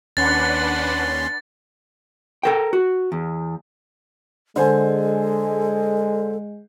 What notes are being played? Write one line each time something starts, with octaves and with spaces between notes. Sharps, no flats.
D#2 C#4 D4 B4 F#5 C6 A6
A4 A#4 G5
F#4
E2
D3 G#3 A4 C5 G#5